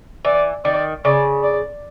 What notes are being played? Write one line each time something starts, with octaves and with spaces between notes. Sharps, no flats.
E3 D5
D#3 D5
C#3 D5
D5